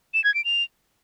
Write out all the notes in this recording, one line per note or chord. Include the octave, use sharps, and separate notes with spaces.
E7
G#6
D7
F7